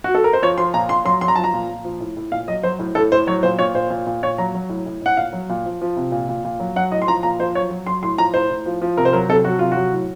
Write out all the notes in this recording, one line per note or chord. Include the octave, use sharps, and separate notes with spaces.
F#4
A4
A#4
C5
F3 C#5
F3 C6
A#2 A#5
A#2 C6
F#3 C6
F#3 C6
A#5
F3 A5
A#5
A#2
A#2
F3
A2
A2
A#2 F5
F#3 D#5
F#3 C5
A2
A2 A4
A2 C5
F#3 C#5
A#2 C5
A#2 C#5
A#2 C5
A#2
A#2
A#2 C#5
F#3 A#5
F#3
A2
A2
A2 F#5
A#2 F5
F#3
A#2
F3
F3
C3
A#2
A#2
A#2
F#3
F#3 F#5
A2 D#5
C6
F3 A#5
A#2 A#5
F3 C5
F#3 C#5
F#3
F#3 C6
A2 C6
F3 A#5
A2 C5
A2
F3
F3
C3 A#4
C5
F#3 A#4
C3 A4
F#3 F#4
C3 F4
F#3 F#4
A2